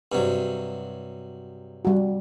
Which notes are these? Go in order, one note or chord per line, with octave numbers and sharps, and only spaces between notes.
G2 C3 F#3
G3 F#4